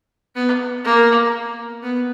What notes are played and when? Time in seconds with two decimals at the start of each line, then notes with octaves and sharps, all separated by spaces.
0.35 B3
0.84 A#3
1.83 B3